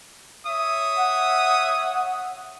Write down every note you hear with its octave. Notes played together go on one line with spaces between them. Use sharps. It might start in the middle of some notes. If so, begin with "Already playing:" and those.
C#5 E5 D#6
F#5